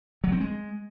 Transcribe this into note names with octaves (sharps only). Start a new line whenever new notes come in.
F#3
C4
G#3